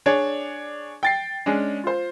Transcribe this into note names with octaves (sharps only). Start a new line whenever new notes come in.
D4 G#4 C#5 D5
G5 A6 C7
G#3 C#4 D4
F4 C5